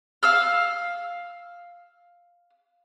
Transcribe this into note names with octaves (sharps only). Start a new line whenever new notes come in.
F5 E6 F6